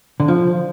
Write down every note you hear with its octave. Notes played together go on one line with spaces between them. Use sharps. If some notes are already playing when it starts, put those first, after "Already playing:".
D3
F3